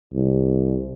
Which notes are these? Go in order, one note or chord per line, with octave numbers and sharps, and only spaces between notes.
C2